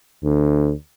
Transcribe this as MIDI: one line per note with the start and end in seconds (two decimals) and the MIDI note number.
0.23 0.71 38